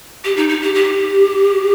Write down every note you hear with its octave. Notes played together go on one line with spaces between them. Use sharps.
G4
D#4
D#4
G4
G4